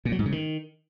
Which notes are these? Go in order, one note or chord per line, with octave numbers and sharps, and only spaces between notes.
A#2
F#3
G#2
C#3
D#3